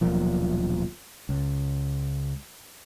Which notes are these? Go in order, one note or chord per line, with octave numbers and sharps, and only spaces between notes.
D#1 B1 A#2 F3
C#2